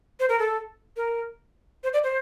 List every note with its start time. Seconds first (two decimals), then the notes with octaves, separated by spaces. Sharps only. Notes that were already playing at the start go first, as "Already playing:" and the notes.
0.20 C5
0.29 A#4
0.39 A4
0.97 A#4
1.84 C5
1.93 D5
2.04 C5